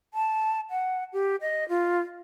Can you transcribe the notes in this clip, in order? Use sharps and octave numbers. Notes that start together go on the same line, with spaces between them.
A5
F#5
G4
D#5
F4